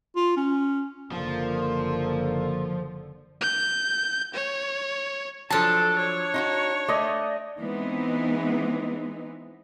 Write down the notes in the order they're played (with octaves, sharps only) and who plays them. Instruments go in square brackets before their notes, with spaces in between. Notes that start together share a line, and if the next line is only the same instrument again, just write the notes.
[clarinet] F4
C#4
[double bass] F#1 D3 [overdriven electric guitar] F3 [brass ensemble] A#3
[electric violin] G6
C#5
[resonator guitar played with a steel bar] F3 F#3 [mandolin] D4 A5 [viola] A4
[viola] C#5
[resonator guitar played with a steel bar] D#4 F4 F#4
[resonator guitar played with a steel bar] A3 [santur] D5 D#5
[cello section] E3 G#3 B3 C4 D#4